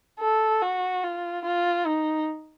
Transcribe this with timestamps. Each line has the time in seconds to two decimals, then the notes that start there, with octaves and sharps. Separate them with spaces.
0.20 A4
0.62 F#4
1.04 F4
1.45 F4
1.86 D#4